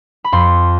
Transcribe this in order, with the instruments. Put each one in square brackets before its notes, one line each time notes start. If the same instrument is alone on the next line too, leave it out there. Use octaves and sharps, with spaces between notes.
[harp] B5
F2 C6